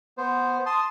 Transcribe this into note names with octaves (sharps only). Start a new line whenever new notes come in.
B3 C5
A5 C6 D#6